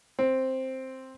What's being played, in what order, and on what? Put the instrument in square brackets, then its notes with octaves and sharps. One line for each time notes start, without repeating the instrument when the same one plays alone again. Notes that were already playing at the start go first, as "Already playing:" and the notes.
[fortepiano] C4